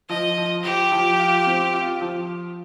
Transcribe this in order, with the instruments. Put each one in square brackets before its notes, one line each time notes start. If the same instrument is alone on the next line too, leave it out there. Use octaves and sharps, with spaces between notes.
[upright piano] F3 [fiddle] D#5
[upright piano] F3
[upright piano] F3 [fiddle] G4
[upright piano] F3
F4
C4
F4
F3